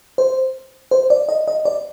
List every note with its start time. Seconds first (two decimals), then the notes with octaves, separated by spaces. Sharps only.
0.18 C5
0.91 C5
1.10 D5
1.29 D#5
1.48 D#5
1.65 D5